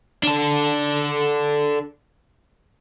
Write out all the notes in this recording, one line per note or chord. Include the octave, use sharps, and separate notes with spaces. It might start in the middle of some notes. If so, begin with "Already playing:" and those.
D4 A4